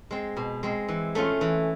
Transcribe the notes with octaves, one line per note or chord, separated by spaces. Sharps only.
G#3 C4
B2
G#3 C4
E3
A3 C#4 F4
E3